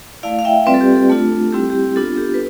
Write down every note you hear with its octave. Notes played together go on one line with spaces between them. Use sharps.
A3 E4 D5 F5
F5
E5 G5
G3 C4 F4 B4 D5
A4
G4
A4
A3 D4 F4
G3 C4 E4 G4
G4
B3 D4 F4 A4
G4
B4